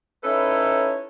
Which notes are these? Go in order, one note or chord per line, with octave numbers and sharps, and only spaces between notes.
C#4 D#4 E4 A4 B4 C#5